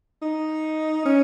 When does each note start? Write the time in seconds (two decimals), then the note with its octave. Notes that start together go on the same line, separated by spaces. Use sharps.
0.22 D#4
1.05 C#4